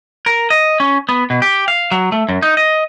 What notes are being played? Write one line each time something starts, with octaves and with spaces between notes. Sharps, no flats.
A#4
D#5
C#4
B3
B2
G4
F5
F#3
A3
F#2
D#4
D#5